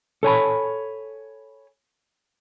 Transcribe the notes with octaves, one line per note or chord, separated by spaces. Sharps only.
A4 C#5 G#5 B5